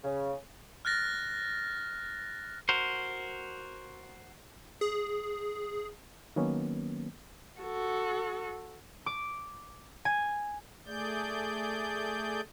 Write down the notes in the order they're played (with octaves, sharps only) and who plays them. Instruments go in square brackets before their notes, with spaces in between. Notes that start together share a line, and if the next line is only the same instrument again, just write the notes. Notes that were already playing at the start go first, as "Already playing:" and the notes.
[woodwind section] C#3
[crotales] F6 F#6 A6 A#6
[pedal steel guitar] F#4 A#4 C5
[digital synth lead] G#4
[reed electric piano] D#3 F#3 A#3 B3 C#4
[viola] F#4 A4
[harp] D6
G#5
[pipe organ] A3 G#4 D5 G6